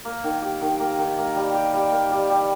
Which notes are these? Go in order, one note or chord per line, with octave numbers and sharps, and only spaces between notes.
A#3
D#3
G4
D#3
A#3
D#3
A#3
G3
G4
G3
A#3
G3
G3